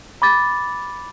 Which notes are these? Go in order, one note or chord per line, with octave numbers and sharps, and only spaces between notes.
B5 D6 A6